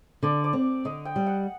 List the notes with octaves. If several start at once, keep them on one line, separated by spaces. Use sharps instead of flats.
D3 D5
D5
C4
D3 D#5
G5
G3
F#5